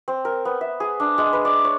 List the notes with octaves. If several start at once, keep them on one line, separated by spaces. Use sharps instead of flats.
C4
A#4
B3
E5
G#4
D4
G#3
B4
D5
C#5